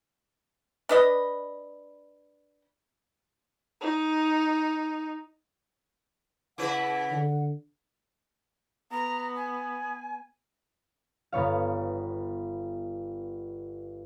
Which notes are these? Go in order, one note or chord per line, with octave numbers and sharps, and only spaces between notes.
D4 B4 D#5
D#4
C#3 E4 B4 F#5
D3
B3 A#5
G#5
G1 B3 C#5 F5